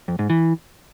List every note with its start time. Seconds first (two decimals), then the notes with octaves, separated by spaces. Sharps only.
0.08 F2
0.19 G#2
0.30 E3